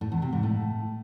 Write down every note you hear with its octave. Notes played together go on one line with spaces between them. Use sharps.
A2
E2
C3
G#2
A2